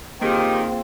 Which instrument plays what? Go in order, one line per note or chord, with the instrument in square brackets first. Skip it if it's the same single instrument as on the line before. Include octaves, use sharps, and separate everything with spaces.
[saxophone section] D#3 [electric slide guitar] A#3 G#4 [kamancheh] C4 F4 [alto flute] G4